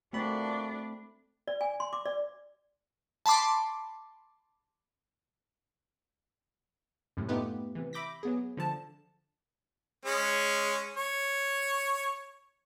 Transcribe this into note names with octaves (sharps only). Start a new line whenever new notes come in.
A#2 D3 A3 C4 D4 F#4 B5
D5
G#5
C6
D6
D5
A5 B5 C6 D6
F#2 A2 C3
A3 B3 D#4 F4 G4 B4
C3 E3
E5 B5 D6 G6 A#6 B6
F#3 B3 G#4
D3 F3 A5
G#3 C#4
C#5